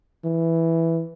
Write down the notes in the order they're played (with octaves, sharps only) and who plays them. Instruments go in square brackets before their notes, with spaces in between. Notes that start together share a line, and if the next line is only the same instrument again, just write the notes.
[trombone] E3